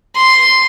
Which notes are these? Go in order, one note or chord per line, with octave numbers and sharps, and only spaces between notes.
C6